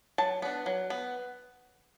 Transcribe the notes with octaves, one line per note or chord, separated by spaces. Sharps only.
F#3 A5
B3 D4
F#3
B3